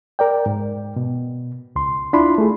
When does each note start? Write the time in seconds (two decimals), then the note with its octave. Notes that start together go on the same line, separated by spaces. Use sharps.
0.19 A#4 D5 G5
0.46 G#2
0.96 B2
1.76 C#2 C6
2.13 D4 E4 F4 B5 C6
2.38 A3 G#4